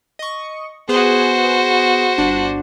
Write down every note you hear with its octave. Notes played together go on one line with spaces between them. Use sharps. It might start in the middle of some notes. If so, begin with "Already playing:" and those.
D#5 C#6
B3 F#4 G#4 B4 C5
G1 D4